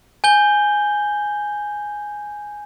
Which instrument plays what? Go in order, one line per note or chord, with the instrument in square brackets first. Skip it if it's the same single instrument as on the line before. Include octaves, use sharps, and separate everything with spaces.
[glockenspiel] G#5 G6 G7